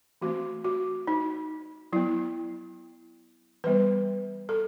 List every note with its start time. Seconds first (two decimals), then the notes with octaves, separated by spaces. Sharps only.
0.22 E3 A3 C4 F#4
0.65 F#4
1.07 D#4
1.93 F#3 B3 E4
3.64 E3 G3 B3 B4
4.49 A4